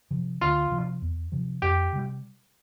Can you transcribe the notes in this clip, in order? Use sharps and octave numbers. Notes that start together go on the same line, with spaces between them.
C3 F3
D2 F4
C3 F3
E2
C3 F3
F2 G4
C3 G3